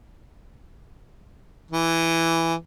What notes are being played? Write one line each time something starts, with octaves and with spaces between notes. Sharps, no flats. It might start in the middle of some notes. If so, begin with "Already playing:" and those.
E3